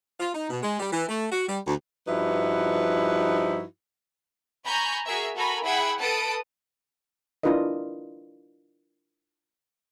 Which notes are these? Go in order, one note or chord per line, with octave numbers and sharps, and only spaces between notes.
F4
D#4
B2
G#3
G3
E3
A3
F#4
G3
D2
G2 F3 D#4 E4 F#4 B4
G#5 A#5 B5 C#6 G6
F#4 G#4 A#4 E5
F#4 A4 A#4 G#5 A#5 B5
E4 G#4 F#5 G5 B5 G#6
A4 B4 A5 D#6 D7
D4 E4 F4 A#4 B4 D#5